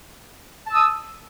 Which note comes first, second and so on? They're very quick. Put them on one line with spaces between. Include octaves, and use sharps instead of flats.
A5 E6 D#6